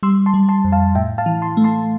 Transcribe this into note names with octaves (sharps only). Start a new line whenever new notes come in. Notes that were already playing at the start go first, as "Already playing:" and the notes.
G3 C6 E6
A5 C6
G3
A5 C6
F2
F5 A5
A2 E5 G5
F5 A5
E3
A5 C6
A3
A5 C6